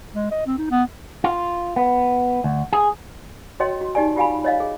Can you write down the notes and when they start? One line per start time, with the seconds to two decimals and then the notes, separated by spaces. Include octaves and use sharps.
0.14 G#3
0.31 D#5
0.46 C4
0.58 D#4
0.71 B3
1.24 F4
1.76 B3
2.44 D2
2.73 G#4
3.60 F#4 C#5 D#5 G5 C6
3.81 F#4
3.95 D#4 G4 D5 G#5
4.16 F4 G4 F5 G#5 B5
4.44 C#5 D#5 F5
4.60 G#4